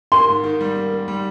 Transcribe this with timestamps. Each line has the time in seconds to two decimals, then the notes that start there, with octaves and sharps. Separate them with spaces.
0.12 A#3 C6
0.28 G#2
0.44 D#3
0.61 G3
0.76 A#3
0.93 A#3
1.08 G3